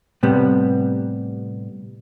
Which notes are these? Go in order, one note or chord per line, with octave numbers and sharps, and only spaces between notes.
A2 C3 G3 B3